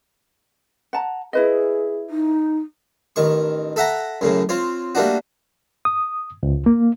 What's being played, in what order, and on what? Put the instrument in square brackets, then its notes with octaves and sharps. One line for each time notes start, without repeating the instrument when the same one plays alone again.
[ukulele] F#5 A5 A#5
[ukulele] E4 B4 D#5 [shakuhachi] G#4
[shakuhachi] D#4
[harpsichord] A1 D#3 C#6
A4 E5 F#5 A#5
F#2 A2 C#3
C4 F4 C#5
G3 A3 A#3 D4 F#4
[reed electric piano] D#6
C#2
A#3